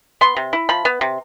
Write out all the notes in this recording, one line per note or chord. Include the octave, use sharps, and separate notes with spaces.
B3 C6
C3
E4
F3 B5
B3
C3